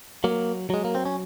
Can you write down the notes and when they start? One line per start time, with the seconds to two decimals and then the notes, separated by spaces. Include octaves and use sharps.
0.24 F#3 A#3
0.70 F#3 G#3
0.85 A#3
0.95 C4
1.05 C#4